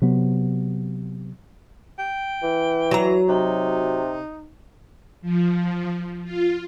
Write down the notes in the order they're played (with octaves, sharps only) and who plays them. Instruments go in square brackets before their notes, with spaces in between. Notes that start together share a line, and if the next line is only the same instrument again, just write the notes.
[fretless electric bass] C3 F#3 B3
[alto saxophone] G5
[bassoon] E3
[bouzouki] F#3 A#5
[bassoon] C3 [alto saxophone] D#4
[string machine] F3
F4